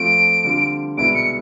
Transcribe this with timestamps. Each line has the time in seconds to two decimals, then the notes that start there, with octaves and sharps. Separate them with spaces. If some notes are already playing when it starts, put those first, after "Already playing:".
Already playing: F3 A3 C4 F4 D7
0.45 D3 G3 C4 F4
0.98 C2 B2 G#3 B3 E4 D7
1.15 C#7